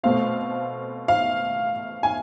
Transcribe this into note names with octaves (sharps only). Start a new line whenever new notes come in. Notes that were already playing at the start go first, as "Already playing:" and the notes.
B2 A3 C4 F5
F5
G#5